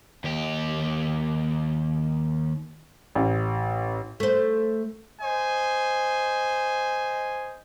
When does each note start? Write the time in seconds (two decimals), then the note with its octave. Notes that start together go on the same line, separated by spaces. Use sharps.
0.24 D#2 G4
3.15 A1
4.20 A3 C5
5.21 C5 D#5 G#5